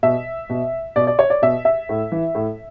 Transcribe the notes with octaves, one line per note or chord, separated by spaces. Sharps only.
B2 E5
B2
B2 D5
D5
C#5
D5
B2 E5
E5
A2
E3
A2